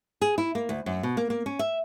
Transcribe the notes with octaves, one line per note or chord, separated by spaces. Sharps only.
G#4
E4
A#3
D2
F#2
B2
A#3
A#3
C#4
E5